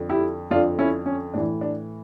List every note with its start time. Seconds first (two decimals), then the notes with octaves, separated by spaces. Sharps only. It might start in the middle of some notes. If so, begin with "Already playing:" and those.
Already playing: F2 D3
0.09 E4 G4
0.51 F2 D3 D4 F4
0.79 C#4 E4
1.06 C#4
1.34 A2 E3 D4
1.61 D4